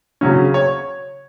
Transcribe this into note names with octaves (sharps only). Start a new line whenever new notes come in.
C#3 F#3 C#4
C#5